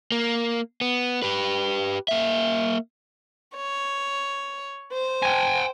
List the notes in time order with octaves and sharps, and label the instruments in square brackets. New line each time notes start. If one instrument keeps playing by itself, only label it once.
[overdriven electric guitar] A#3
B3
G4 B4
A#3 E5
[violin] C#5
C5
[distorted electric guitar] G5 G#5